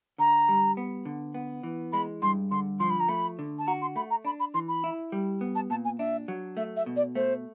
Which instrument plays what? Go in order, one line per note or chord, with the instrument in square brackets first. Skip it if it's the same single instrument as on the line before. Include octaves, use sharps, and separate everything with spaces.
[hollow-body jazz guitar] D3 [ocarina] A#5
[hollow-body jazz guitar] G3
B3
D3
B3
E3
[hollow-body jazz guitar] G#3 [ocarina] B5
[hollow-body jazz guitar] G2 [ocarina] C6
[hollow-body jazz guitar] D3 [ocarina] C6
[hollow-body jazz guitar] F3 [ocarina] C6
[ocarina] B5
A#5
[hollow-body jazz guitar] A3 [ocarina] B5
[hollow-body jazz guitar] D3
[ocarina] A5
[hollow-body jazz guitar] F#4 [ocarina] A#5
[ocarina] C6
[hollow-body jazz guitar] A3 [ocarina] B5
[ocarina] A#5
[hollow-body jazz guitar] D4 [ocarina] B5
[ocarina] B5
[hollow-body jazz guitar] E3 [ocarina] C6
[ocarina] B5
[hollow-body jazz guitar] E4
G3
B3
[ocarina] A5
[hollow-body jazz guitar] A#2 [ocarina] A5
[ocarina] G#5
[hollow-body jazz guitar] D4 [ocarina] E5
[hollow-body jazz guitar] F#3
[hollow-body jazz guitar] A3 [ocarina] E5
[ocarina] E5
[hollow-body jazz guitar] B2
[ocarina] D5
[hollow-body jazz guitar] A3 [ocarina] C5